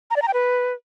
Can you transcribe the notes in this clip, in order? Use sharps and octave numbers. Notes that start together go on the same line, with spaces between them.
A#5
D5
A#5
G5
B4